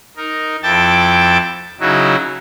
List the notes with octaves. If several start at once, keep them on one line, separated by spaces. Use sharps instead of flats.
D#4 A#4
F2 E4 G5 A5 D6 A6
C#3 F#3 D#4 E4 F#4